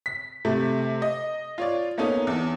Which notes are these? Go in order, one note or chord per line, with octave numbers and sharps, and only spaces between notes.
B6
C3 A3
D#5
F4 C#5 D5
A#3 B3 C#4 D#4 A4
E2